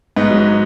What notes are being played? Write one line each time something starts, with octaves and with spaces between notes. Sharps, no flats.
G#2 B3 D#4
F#3